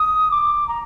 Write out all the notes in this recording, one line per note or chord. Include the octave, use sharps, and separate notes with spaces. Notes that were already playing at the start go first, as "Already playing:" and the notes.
Already playing: D#6
D6
A#5